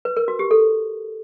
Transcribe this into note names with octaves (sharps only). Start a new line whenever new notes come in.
B4
A#4
F#4
G4
A4